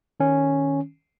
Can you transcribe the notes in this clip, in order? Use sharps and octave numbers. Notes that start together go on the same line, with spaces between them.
D#3 C#4